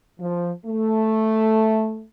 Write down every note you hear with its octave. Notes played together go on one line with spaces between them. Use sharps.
F3
A3